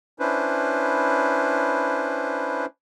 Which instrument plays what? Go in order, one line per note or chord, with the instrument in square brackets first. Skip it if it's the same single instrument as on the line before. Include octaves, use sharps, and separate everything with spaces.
[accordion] C#4 D4 E4 B4 C5